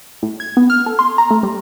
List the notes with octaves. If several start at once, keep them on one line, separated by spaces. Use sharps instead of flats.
A2
G#6
B3
F6
A4
C6
A#5
A3
G3